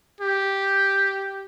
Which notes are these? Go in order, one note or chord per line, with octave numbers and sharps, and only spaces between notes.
G4